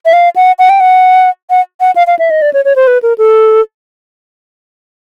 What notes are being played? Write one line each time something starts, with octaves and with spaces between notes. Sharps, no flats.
E5
F5
F#5
F#5
G5
F#5
F#5
F#5
F5
F5
E5
D#5
D5
C#5
C#5
C5
B4
A#4
A4